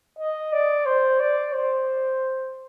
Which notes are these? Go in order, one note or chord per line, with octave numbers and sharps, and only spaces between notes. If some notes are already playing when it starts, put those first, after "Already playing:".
D#5
D5
C5
D5
C5